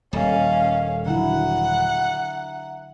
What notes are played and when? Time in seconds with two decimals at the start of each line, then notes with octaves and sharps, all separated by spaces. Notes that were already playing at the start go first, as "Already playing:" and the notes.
0.13 D#1 G3 C#4 A4 D#5 F5
1.06 D3 F#3 E4 E5 F#5 A#5